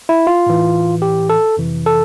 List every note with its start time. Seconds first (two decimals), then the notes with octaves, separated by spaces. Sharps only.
0.09 E4
0.27 F4
0.46 A2 E3
1.02 G4
1.30 A4
1.57 F2 C3 E3
1.86 A4